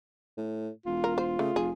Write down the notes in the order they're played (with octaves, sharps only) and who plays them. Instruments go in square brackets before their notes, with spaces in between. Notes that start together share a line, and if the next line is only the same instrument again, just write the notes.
[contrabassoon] A2
[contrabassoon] E1 [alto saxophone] F4
[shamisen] A#4
C5
[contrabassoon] C#3 [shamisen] A3
[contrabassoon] F1 [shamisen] G#4